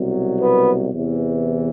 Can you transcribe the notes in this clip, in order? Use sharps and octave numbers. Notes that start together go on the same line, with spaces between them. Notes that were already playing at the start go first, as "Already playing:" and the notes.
Already playing: C2 B2 F#3
B3
E2 C3 E3